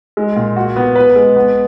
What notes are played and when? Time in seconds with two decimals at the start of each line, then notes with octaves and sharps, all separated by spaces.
0.17 G#3
0.36 A#2
0.56 F#4
0.76 B3
0.96 B4
1.16 G#3
1.36 B3